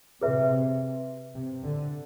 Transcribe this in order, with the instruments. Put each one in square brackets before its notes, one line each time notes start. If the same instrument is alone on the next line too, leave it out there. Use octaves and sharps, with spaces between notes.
[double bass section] C3 [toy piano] G#4 B4 E5
[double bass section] C3
D3